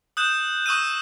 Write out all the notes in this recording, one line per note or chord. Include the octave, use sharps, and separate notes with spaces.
D#6 F#6 G6 E7
C#6 D#6 E6 F#6 D#7